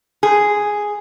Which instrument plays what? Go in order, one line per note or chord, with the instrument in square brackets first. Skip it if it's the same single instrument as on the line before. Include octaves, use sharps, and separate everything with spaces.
[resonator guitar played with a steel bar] G#4